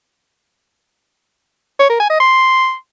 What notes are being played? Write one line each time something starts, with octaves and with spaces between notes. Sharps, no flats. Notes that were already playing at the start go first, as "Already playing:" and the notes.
C#5
A#4
G#5
D#5
C6